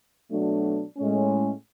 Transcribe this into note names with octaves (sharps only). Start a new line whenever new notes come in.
B2 F#3 A3 D4
A2 G#3 C#4